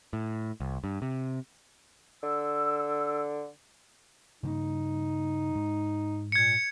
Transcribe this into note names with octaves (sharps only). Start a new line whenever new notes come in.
A2
C2
G2
C3
D3 E6
G2 C#3 A#3 D#4
G#2
A#2 G#6 C#7